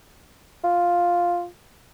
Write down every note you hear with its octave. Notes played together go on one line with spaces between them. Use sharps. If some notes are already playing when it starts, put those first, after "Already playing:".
F4